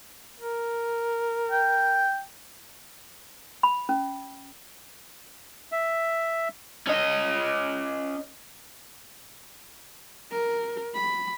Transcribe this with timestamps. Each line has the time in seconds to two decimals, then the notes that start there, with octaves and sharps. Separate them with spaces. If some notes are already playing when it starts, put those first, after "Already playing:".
0.40 A#4
1.51 G5
3.63 B5
3.89 C#4
5.72 E5
6.87 C#4 D#5
10.31 A#4
10.95 B5